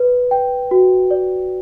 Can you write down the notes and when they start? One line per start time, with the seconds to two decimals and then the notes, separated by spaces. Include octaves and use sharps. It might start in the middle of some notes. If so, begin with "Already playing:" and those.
Already playing: B4
0.31 G5
0.71 F#4
1.11 D5